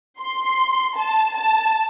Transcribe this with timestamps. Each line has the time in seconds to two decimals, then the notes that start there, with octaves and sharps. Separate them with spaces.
0.21 C6
0.99 A5
1.37 A5